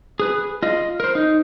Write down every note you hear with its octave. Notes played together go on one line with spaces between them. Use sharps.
G#4 B4
F4 D#5
A#4 C5
D#4